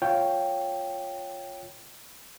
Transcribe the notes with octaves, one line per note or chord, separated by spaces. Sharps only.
F4 C#5 G5